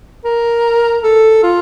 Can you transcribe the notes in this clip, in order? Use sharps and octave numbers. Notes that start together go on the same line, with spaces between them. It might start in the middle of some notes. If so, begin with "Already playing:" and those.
A#4
A4
F4